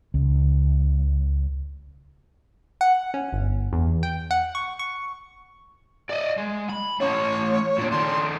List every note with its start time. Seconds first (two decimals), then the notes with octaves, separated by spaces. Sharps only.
0.14 C#2
2.81 F#5
3.14 C#4
3.33 G1
3.73 E2
4.03 G5
4.31 F#5
4.55 C#6
4.79 C#6
6.10 D5 D#5
6.38 G#3
6.69 B5
7.00 A3 C#4 C#5
7.78 A#2 D3
7.91 D#3 D4 C6